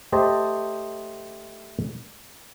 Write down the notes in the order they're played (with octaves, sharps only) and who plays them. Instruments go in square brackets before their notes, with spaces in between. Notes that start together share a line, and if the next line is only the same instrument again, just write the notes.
[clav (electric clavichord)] A3 G4 C5 D#5 A5